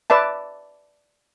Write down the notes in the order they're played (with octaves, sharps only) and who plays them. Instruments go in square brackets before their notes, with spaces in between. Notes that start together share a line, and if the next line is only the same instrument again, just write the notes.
[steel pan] B4 D5 E5 A5